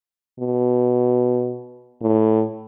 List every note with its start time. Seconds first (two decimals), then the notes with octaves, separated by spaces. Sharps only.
0.39 B2
2.02 A2